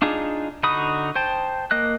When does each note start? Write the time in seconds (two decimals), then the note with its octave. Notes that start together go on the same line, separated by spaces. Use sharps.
0.02 D4 D#4 F4 G#4
0.63 D3 D#4 F#4 B5 D#6
1.15 C5 G5 A5
1.71 A#3 D#5 F#6